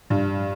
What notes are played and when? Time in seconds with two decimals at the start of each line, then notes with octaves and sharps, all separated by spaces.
0.10 G2